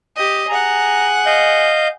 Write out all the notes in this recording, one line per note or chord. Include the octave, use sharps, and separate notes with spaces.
G4 D#5
G#4 F#5 A#5
D#5 F5 G6